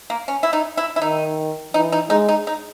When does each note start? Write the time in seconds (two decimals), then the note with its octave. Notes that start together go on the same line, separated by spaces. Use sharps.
0.10 A#3
0.28 C#4
0.43 E4
0.53 D#4
0.77 E4
0.96 E4
1.01 D#3 D#4
1.74 E3 D#4
1.92 D#4
2.10 G#3 D#4
2.28 D#4
2.47 D#4